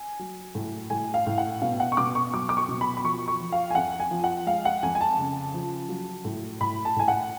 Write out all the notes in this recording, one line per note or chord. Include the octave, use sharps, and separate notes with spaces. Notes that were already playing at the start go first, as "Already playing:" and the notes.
Already playing: G#5
F#3
A2
A2 G#5
F5
A2
F#5
B2 F5
F#5
C#6
B2 D6
C#6
F#3 D6
D6
C#6
B2
B5
B5
F3 C#6
C#6
F3
F5
G#5
F2 F#5
G#5
F3
F#5
G#3 F5
F#5
F2 G#5
G#5
A5
C#3
F3
F#3
A2
A2 B5
A5
A2 G#5
F#5